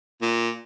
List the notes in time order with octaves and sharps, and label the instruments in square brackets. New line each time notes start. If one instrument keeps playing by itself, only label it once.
[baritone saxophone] A#2